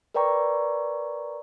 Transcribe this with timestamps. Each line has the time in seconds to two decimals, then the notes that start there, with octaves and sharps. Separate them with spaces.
0.14 A#4 B4 D5 G5 A#5 C#6